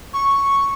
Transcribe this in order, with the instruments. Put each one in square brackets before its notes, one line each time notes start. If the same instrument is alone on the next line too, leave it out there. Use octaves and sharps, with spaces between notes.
[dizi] C#6